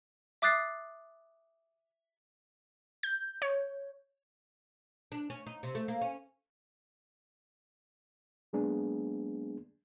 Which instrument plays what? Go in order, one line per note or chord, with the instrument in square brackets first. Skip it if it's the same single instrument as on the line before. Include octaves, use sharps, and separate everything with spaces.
[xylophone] E5 D6 D#6 F#6 A6 C7
[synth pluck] G6
C#5
[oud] D4
C#4
D#4
C3
A3
A#3
C#4
[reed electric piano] F#3 G#3 A#3 B3 D4 G#4